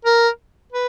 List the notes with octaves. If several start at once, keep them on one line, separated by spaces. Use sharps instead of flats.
A#4
B4